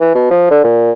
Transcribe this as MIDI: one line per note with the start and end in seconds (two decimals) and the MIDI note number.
0.01 0.13 52
0.15 0.27 47
0.31 0.47 53
0.51 0.60 50
0.64 0.92 46